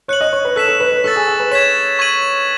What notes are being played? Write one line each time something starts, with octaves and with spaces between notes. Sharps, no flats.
C#5 F#6 C#7 F#7
D#5
C#5
B4
A4 F#6 B6 E7
A4
B4
B4
A4 C#6 E6 A6
G#4
G#4
B4
C#5 G#6 B6 E7
C#6 G#6 D#7 F#7